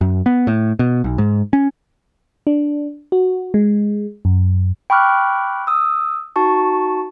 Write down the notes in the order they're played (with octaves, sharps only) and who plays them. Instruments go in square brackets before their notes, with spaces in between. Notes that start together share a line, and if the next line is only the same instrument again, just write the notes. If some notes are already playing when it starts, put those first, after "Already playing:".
[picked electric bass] F#2
B3
A2
B2
B1
G#2
C#4
[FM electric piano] D4
F#4
G#3
F#2
[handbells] G5 B5 C#6 D6 F6 F#6
D#6 E6
D#4 F#4 A5 C#6